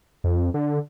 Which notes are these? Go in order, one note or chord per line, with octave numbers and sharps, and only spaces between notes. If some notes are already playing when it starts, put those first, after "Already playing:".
F2
D3